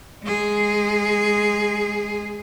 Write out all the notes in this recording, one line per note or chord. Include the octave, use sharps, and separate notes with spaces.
G#3 G#4